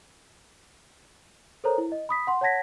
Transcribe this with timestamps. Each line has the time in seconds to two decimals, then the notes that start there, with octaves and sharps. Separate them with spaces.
1.64 A4 A#4 C5 C#5 A#5
1.78 E4
1.92 D#5
2.09 B5 D#6 B6
2.27 F#5 C6
2.41 C#5 F#5 A5 G#6 A#6 B6